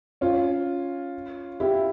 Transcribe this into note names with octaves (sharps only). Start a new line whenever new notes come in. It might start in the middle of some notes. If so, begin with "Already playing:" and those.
C#4 F4
E4 G4